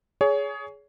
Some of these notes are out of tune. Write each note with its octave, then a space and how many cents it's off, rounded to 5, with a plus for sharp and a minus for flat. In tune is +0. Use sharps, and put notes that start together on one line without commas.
G#4 +10 C#5 +25